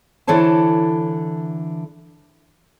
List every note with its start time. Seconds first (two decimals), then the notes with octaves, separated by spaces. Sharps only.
0.27 D3 E3 A4 C5 C#5 A5